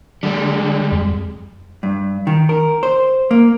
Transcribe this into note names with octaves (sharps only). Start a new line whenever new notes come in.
D3 G3 G#3
F2
G2
D#3
A#4
C5
A#3